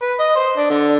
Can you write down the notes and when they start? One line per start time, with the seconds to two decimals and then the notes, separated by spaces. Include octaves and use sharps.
0.02 B4
0.20 D#5
0.36 C5
0.57 D4
0.70 D3